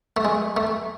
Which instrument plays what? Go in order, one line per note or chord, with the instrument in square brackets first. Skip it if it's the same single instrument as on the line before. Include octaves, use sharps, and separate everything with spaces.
[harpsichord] A3
G#3
A3